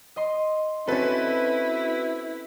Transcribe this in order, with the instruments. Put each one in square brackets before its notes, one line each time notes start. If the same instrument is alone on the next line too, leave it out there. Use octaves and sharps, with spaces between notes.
[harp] D#5 C6
[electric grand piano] C4 F#4 B4 [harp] C#4 A4 [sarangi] E4